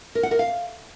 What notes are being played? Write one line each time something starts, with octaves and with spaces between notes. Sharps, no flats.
A#4
F#5
A#4
F5